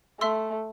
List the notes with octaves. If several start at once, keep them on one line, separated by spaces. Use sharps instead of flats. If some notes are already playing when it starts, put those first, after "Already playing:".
A3 E5 C6 E6